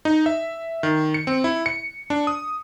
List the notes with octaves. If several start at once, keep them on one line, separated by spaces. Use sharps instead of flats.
D#4
E5
D#3
C#7
C4
E4
C#7
D4
D#6